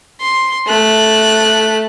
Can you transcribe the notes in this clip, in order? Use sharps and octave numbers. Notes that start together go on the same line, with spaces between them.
C6
A3 F#6